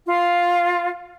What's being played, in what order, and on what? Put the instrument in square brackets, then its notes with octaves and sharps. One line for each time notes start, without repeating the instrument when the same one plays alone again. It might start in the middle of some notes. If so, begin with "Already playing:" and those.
[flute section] F4